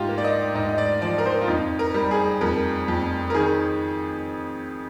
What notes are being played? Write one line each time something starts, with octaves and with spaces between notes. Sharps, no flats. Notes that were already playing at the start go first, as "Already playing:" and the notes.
Already playing: G#2 F4 G4
A#3
D5
D#5
G#2 D#5
D#5
D5
F3 D5
A#4
C5
F4
F2 D#4
A#4
G3
G#4
F2 A#4
F2
A#4
D#3 G#4